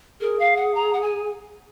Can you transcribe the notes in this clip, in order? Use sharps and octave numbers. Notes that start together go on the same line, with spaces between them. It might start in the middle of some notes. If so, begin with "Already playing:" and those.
G#4 A#4
F5
F#5
A#5
F#5
G#5